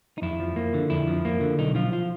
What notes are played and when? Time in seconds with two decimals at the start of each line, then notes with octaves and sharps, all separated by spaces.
0.18 D#4
0.22 F2 E4
0.40 F3
0.56 A#3
0.74 D3
0.90 F2 E4
1.08 F3
1.25 A#3
1.41 D3
1.58 B1 D#4
1.75 F3 F4
1.93 F4